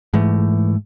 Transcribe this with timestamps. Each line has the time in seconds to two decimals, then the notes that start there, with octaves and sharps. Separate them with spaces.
0.14 G#2 E3 A3